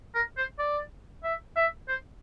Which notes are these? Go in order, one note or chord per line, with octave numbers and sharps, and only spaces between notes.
A#4
C5
D5
E5
E5
C5